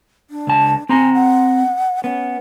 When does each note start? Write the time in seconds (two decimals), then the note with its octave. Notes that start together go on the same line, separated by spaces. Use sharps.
0.30 D4
0.47 C#2 A5
0.89 C4 G#5 A#5
1.14 F#5
2.04 B3 C#4